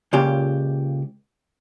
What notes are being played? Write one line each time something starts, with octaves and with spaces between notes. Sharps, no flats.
C#2 A#2 C#3 G4